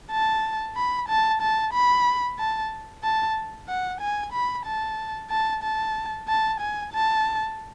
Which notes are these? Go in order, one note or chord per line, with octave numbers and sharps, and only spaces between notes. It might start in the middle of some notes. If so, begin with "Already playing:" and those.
A5
B5
A5
A5
B5
A5
A5
F#5
G#5
B5
A5
A5
A5
A5
G#5
A5